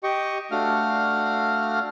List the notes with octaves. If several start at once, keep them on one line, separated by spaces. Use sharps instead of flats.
G4 D#5 C#6
A3 D4 F#4 F5 F6